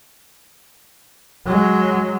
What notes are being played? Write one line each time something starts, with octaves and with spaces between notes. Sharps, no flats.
F#3 G#3